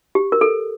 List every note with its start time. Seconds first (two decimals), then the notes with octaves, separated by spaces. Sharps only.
0.15 G4
0.32 A#4
0.41 A4